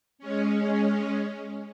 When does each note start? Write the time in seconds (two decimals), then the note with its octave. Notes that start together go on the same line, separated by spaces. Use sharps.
0.19 G#3 C#4